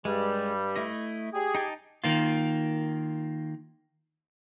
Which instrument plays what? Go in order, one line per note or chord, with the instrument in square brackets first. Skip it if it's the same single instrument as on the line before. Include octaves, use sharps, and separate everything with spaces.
[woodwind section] G2 G3 [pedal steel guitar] G#3
[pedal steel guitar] A3 E4 D#5
[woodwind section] G4 G#4
[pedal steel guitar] D#4 G5 A5
[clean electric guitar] D#3 A#3 F4